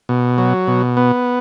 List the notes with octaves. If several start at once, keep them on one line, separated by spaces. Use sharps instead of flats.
B2
F#3
B2
B3